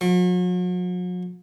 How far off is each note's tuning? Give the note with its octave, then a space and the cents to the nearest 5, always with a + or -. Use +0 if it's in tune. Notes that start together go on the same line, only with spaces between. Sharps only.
F#3 -45